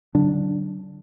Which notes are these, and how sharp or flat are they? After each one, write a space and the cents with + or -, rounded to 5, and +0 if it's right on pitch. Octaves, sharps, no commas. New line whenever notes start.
D3 -10 F#3 +35 D4 +0